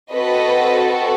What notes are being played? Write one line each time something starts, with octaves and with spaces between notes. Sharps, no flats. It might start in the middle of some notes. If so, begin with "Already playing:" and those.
C4 F#4 A4 B4 D#5